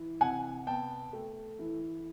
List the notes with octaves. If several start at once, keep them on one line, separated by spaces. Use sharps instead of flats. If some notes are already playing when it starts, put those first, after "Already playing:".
Already playing: E3
C3 F#5 G#5
B3 G5 A5
A3
E3